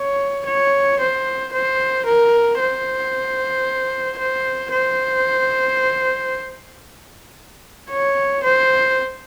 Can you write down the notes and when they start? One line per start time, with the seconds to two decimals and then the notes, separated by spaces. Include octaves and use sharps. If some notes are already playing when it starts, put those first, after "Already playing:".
Already playing: C#5
0.47 C#5
1.00 C5
1.53 C5
2.06 A#4
2.60 C5
4.19 C5
4.72 C5
7.90 C#5
8.44 C5